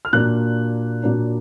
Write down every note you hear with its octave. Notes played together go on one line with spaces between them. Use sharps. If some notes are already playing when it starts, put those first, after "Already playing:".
F6
A#2 F#3 A#3 D4 F#6
A#2 F#3 A#3 D4